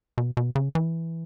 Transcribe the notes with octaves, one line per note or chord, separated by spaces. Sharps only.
B2
B2
C#3
E3